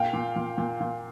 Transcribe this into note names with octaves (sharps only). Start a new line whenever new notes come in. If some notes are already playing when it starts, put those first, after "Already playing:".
Already playing: A#2 F5 G5
A#2
A#2
A#2
A#2